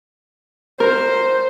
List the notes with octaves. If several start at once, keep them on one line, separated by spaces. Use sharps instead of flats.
A#4 C5